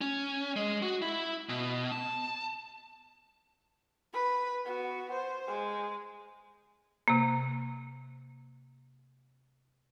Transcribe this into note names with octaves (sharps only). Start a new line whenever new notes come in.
C#4
G#3
F#4
E4
B2
A5
B4 B5
B3 F#4
C5
G#3
C3 A#3